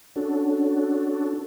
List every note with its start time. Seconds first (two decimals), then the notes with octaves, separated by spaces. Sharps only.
0.16 C#4 D4 F#4 A4